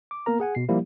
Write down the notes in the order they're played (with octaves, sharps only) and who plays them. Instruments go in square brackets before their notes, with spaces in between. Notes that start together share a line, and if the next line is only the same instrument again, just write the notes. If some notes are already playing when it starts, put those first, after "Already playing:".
[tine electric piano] D6
A#3 B3 A#4 A#5
G#4 F#5 G#5
B2 C7
F3 G3 A#3 E4 G4